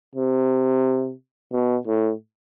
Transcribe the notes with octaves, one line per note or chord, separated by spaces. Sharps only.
C3
B2
A2